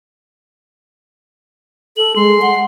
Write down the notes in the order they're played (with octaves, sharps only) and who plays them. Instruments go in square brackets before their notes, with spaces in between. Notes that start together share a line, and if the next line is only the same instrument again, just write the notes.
[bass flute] A4 [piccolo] F#7
[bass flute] G#3 [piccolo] C6
[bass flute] F#5